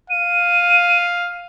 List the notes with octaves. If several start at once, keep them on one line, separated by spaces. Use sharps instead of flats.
F5 D#7